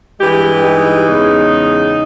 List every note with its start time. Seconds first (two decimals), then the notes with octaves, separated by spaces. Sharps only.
0.19 G2 E3 G#3 G4
0.63 D#4
1.07 E2 C#3 G#3